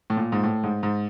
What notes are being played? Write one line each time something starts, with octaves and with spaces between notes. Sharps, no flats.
A2
A#2
G#2
A2
G#2
G#2